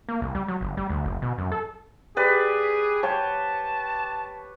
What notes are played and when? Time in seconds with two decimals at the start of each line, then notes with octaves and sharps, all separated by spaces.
0.09 A#3
0.22 C2
0.35 G3
0.48 F#3
0.61 G1
0.77 G3
0.89 D2
1.05 F#1
1.22 B2
1.38 F#2
1.52 A4
2.17 G4 G#4 B4 D5
3.03 C#5 G5 A5